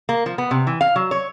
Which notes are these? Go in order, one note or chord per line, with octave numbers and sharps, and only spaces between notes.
A#3
F3
B3
C3
E3
F5
F#3
C#5